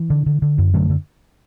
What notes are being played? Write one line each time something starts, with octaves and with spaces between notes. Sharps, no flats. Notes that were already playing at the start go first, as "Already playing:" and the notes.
Already playing: E3
D3
D3
D3
F#2
D3 F#3 A3
D3